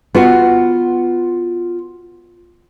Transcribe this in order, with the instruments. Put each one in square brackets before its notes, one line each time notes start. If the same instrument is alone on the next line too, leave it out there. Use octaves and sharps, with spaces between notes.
[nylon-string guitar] B3 F4 F#4 F#5